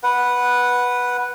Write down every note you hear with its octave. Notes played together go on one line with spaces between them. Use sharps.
B4 F#5